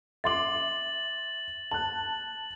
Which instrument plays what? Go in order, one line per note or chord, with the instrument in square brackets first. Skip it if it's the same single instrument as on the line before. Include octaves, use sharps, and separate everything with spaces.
[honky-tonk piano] E5 C6 D6 [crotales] A6 F#7
[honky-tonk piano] A5 F#6 [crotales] F#7